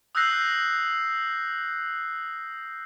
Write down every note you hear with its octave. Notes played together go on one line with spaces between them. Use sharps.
D#6 E6 F#6 G6 A#6 C7